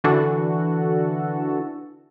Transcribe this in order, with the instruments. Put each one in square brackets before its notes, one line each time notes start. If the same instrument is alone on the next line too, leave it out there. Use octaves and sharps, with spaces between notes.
[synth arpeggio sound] D3 E3 D4 F#4 A4